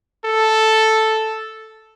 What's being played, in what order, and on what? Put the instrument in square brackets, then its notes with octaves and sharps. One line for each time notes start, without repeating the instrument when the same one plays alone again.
[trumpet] A4